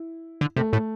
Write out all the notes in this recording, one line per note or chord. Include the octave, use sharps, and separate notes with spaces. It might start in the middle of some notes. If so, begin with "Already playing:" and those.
Already playing: E4
D3
C3 A3
A2 A3